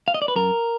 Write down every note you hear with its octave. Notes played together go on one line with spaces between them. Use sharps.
F5
D#5
D5
B4
F#2 A#4